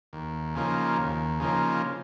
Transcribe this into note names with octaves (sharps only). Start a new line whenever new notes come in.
D#2
C#3 F3 A#3 D#4
D#2
C#3 F3 A#3 D#4